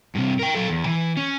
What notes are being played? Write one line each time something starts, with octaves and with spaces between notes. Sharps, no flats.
G2 C3
A#4 G5
F#3 A4
E2
E3
C#4